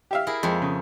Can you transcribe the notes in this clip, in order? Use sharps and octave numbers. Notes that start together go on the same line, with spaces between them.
G4 E5 F5
E4 G#4 A#4
F2 G#3 E5
C#3